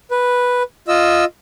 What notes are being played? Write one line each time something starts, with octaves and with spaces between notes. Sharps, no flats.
B4
F4 D#5 E6